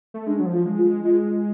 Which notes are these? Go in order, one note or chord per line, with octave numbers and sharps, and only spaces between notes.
A3
G#3 D4
F#3
F3
F4
G#3
F4
G#3
G#3 F4